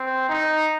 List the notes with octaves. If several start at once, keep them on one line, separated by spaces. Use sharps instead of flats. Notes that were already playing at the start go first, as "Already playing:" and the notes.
Already playing: C4
D#4